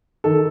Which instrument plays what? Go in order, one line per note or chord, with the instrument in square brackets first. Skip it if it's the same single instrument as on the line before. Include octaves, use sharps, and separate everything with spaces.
[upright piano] D#3 A4